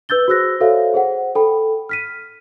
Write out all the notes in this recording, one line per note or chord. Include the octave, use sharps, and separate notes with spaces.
B4 E6 G6 A6 G7
F#4 G#4 C5 E6 F#6 A#6
F#4 A4 C5 C#5 E5 F5
G#4 C5 F#5
A4 G5 B5
F6 B6 D#7